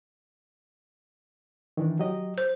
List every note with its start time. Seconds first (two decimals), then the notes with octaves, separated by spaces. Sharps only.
1.77 D#3 E3 D4
1.99 F#3 G4 D#5
2.38 C5